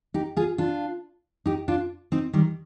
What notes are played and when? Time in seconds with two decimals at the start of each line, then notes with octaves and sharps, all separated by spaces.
0.14 D#4 G4
0.36 F4 G#4
0.58 D4 F4
1.46 D#4 G4
1.68 D4 F4
2.12 C4 D#4
2.33 D#3 G3